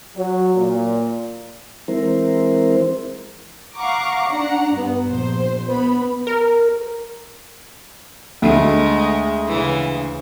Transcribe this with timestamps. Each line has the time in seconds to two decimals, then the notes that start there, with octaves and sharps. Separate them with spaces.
0.15 F#3
0.55 A#2
1.88 E3 G#3 C4 E4 A#4 C5
3.77 F5 F#5 A#5 C#6 D6
4.29 D4 F#5 A#5
4.72 G2 B3
5.05 A#1 C5
5.68 B3 B5
6.27 A#4
8.42 D2 G#3 A3
9.48 C#3 E3